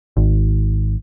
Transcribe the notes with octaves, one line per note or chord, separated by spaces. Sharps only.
G#1